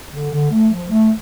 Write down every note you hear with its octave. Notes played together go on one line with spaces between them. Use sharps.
D3
D3
A3
F3
A3